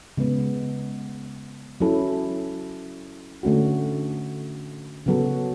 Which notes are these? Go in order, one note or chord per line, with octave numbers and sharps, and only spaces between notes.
C#3 G#3 B3
F#3 C#4 E4 A4
D3 A3 C#4 F#4
C#3 F#3 B3 F#4 A4